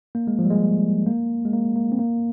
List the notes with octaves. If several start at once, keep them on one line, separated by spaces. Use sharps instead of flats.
A#3
G#3
F3
G3
G#3
A#3
G#3
A#3
A#3
C4
A#3